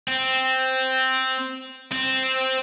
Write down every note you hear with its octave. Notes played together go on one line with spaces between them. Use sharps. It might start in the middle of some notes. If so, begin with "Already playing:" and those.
C4
C4